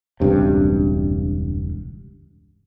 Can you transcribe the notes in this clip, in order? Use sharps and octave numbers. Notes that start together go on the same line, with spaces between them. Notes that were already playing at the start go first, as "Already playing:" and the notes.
E1 C#2 G2 C3